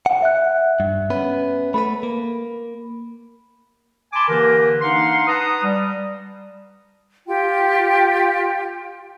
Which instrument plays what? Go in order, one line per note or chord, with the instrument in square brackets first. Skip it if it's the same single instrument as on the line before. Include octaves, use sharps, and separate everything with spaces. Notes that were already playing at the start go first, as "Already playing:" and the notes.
[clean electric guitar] F#5
[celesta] E5 F#6
[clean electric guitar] G2
B3 C#4 B4
[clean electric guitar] A3 A4 B4 [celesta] B5
[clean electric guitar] A#3
[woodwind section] G#5 A5 B5 C6 D6
D3 E3 A#3 G4 A#4
D4 D#4 F5 F#5 C6
B4 F#5 A5 A#5 D#6
G3
[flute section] F4 G4 G5